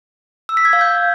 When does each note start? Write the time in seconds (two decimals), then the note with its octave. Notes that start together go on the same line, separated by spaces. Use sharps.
0.49 E6
0.57 B6
0.65 G#6
0.73 F5
0.81 G6